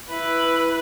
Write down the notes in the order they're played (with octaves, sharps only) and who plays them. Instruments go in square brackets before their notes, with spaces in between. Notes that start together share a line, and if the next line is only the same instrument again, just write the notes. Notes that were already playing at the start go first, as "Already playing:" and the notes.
[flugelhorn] E4 [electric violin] B4 [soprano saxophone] B5